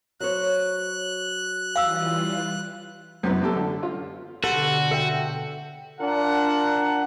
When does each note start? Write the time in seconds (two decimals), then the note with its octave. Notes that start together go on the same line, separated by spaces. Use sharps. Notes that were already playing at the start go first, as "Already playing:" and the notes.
0.20 F#3 C5 C#5 F#6
1.76 E3 G3 F4 F5 E6
3.23 F#2 C3 B3 E4
3.41 F#2 G4 A4
3.56 D3
3.83 F4
4.44 B2 D3 F#4 G4 A4 B4 C5 F#5
4.91 A4 E5 G5
5.99 D4 F4 A#4 F#5